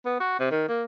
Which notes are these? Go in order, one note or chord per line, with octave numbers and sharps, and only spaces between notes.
B3
F#4
C3
D#3
A#3